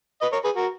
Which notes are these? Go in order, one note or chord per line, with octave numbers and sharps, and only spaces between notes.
B4 D#5
A#4 C#5
G#4 B4
F#4 A#4